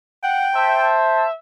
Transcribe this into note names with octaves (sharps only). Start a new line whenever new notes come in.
F#5 G5
C5 E5 A5